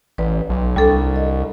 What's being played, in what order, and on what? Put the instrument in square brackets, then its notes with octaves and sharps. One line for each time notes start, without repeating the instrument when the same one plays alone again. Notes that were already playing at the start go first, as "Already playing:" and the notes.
[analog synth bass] A1 [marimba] B4 D5
[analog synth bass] B1
[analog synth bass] C2 [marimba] G3 D4 A4
[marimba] D#5